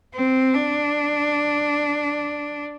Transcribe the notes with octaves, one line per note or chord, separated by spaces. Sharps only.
C4
D4